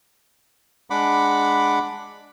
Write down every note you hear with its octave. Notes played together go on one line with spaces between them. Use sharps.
G#3 D4 F#5 B5 D6